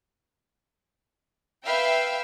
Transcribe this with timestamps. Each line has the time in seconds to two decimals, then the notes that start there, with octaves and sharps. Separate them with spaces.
1.64 B4 E5 F5 G5